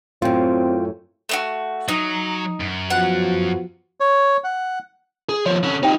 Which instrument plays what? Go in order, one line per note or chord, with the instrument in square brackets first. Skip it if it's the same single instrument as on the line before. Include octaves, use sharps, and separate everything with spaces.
[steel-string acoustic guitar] F#2 A2 [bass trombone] C4 [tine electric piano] F4 G5
[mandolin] A3 D#4 F#4
[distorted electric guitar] F#3 [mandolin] D#4
[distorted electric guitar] F#2
[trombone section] F3 B3 F#4 [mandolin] F#5
[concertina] C#5
F#5
[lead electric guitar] G#4
[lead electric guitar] D#2 F3 [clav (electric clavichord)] C#5
[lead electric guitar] D3 C#4
[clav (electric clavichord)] C4 G4 [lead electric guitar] D#4 F4